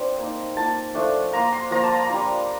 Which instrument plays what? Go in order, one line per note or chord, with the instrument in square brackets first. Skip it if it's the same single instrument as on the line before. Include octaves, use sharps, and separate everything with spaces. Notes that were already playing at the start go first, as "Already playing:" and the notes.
Already playing: [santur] C4 D4 F4
A#3 D#4
A#3 F4 A5
F3 A3 D4
A#3 F4 A#5
C6
F3 A#3 F4 A#5
A5
A#5
G3 D4 F4